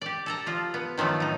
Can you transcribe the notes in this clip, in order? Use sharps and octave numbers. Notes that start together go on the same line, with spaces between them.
G4 D5
A4 A5 A#5
F3 F4
B3
D#3 F3 F#3 A3
A2 D#4